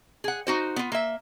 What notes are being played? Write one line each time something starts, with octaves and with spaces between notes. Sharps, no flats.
G#4 F#5
D#4 F#4 C5
B3 F4
A#3 E5